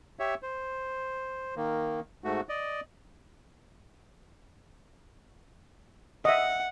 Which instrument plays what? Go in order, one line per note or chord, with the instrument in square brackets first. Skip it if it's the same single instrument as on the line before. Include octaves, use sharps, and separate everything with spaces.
[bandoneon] G4 C#5 E5
C5
D#3 A#3
G#2 A3 F#4
D5 D#5
[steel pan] D#5 E5 [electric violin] F#5